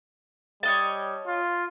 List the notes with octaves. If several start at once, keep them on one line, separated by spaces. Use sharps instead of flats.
G3 C#5 D#5 A5
F4